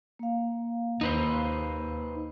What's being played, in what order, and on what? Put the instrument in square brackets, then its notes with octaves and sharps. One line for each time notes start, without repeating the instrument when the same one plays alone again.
[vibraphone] A#3 F5
[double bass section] D#2 [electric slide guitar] D#4 B4 C5